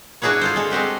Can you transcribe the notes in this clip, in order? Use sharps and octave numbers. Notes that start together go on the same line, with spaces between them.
D4 E4 F#4 G#4 B4 C#5
F4 A4 C5
G#3 A4
G#3 C4 F#4 G4